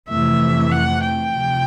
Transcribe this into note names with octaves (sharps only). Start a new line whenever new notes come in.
F2 C3 E3 A3 E5
F#5
G5
D2 C3 F3